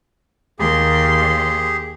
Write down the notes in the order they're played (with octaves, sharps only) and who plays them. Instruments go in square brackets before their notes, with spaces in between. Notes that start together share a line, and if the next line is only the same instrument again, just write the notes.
[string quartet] D#2 C6 [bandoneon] G4 G#4